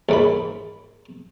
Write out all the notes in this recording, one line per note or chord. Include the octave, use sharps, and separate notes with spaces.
D#2 G#2 B5